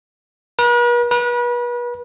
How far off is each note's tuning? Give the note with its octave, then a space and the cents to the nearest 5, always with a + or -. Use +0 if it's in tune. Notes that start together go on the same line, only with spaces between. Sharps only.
B4 -45
B4 -35